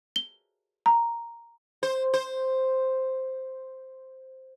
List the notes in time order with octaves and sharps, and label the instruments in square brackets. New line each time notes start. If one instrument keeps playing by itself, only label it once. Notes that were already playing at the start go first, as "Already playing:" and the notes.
[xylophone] G7
A#5
[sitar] C5
C5